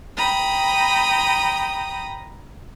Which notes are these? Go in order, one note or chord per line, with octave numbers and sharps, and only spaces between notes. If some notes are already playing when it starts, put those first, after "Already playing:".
G5 A#5 B5 D#6